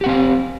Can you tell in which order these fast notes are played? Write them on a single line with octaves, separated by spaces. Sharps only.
G4 F#5 C4 F5